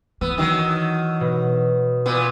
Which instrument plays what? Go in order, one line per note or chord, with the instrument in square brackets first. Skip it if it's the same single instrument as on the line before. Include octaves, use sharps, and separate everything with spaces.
[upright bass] E3 [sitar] B3 [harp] E6
[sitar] D#3 F#3
[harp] B2
[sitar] A#2 B3